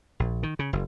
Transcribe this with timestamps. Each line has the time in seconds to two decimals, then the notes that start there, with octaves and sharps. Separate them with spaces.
0.20 A#1
0.43 D#3
0.59 C#3
0.73 F#1